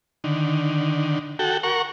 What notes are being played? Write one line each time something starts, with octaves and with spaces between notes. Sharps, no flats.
D3 D#3
F#4 A4 G5
A#4 F#5 C#6